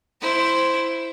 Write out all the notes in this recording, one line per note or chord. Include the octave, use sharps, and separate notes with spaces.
E4 C5